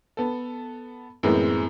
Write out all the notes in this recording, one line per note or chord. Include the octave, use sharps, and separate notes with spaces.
B3 A4
F#2 A2 E3 G#3 B3 C4